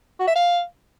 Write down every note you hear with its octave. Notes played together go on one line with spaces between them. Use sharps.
F#4
E5
F5